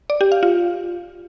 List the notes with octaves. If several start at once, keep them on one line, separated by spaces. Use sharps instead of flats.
D5
G4
F5
F4